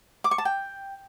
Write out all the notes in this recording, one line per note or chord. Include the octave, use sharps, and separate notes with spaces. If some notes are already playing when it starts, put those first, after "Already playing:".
D6
C#6
A5
G5